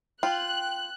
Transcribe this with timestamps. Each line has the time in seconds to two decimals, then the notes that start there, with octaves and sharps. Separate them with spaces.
0.23 F4 G5 F#6